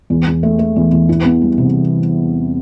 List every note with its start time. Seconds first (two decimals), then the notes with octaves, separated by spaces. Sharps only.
0.10 E2
0.27 E2
0.43 A3
0.59 A3
0.76 E2
0.92 E2
1.09 E4
1.25 B3
1.41 G3
1.58 C3